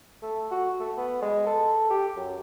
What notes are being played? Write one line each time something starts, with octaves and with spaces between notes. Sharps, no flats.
A3
F#4
A3
B3
G#3
A4
G4
F#2